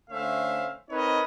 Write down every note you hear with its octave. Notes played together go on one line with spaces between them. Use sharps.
D3 A3 C#4 C5 E5 F5
C4 D#4 A#4 B4 C#5 D#5